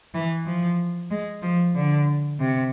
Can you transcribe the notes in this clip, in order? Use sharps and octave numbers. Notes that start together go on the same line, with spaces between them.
E3
F3
G#3
F3
D3
C3